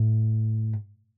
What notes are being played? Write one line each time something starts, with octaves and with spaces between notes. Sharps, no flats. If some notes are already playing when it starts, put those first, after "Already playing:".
Already playing: A2